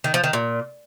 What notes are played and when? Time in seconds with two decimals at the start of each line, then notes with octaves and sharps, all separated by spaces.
0.04 D#3
0.14 F3
0.24 D#3
0.33 A#2